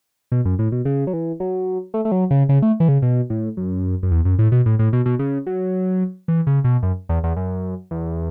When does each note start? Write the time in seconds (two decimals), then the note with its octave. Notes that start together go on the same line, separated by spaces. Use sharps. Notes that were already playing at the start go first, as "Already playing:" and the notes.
0.32 B2
0.45 F#2
0.59 A2
0.72 B2
0.85 C#3
1.07 F#3
1.13 E3
1.40 F#3
1.94 A3
2.05 A3
2.12 F#3
2.31 C#3
2.49 C#3
2.62 A3
2.80 E3
2.89 C#3
3.02 B2
3.30 A2
3.57 F#2
4.03 F#2
4.11 E2
4.25 F#2
4.39 A2
4.52 B2
4.66 A2
4.79 A2
4.93 B2
5.06 B2
5.19 C#3
5.47 F#3
6.28 E3
6.47 C#3
6.64 B2
6.83 F#2
7.09 E2
7.24 E2
7.37 F#2
7.91 E2